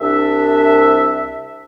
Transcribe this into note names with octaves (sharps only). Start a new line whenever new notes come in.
C2 D4 E5